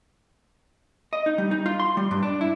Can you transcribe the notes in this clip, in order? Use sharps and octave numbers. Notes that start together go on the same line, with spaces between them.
D#5
D#4
G3
D#4
F4
C6
G3
G2
D4
E4